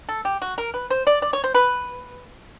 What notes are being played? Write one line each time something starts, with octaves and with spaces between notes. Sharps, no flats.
A4
G4
F#4
A#4
B4
C5
D5
D5
C#5
C5
B4